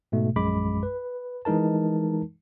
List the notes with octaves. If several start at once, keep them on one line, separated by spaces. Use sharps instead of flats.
G#2 B2 A3
A#1 F#2 G#3 B5 D6
B4
E3 G#3 D#4 A#4 A5